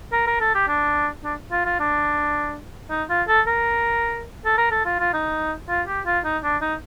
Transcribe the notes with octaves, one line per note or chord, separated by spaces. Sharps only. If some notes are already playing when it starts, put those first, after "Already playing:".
A#4
A#4
A4
G4
D4
D4
F4
F4
D4
D#4
F4
A4
A#4
A4
A#4
A4
F4
F4
D#4
F4
G4
F4
D#4
D4
D#4